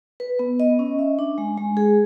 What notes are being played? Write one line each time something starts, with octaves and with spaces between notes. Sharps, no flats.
B4
B3
D#5
C#4
E5
D4
G#3
G#3
G#4